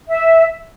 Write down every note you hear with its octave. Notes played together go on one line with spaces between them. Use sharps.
E5